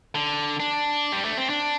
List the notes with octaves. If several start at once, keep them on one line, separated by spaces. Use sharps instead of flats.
D3
D4
G3
A3
C4
D4